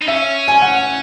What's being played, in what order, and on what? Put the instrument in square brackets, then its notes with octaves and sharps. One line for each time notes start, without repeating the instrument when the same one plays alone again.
[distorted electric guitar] D#4
[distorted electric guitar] C#4 [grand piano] E5
[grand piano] G#5
F#5